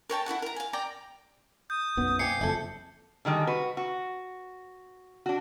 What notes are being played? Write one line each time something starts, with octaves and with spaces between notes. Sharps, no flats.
A#4 C#5 G5 A5
E4 F#4 A4 F#5
A#4 A#5
F5 G#5
D5 G5 A#5
D#6 G6
B1 F#2 B3
A#3 C4 G4 G#5 C7 C#7
F#1 F2 E4 A4
D3 D#3 G3 G#3
F#4 B4
F#4
D4 F#4